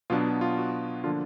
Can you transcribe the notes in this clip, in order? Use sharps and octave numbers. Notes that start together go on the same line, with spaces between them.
B2 F#3 B3 D4 F4
F4
F#4
D3 F3 A#3 D4 F4